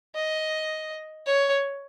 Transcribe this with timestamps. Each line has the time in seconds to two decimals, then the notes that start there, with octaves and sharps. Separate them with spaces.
0.16 D#5
1.26 C#5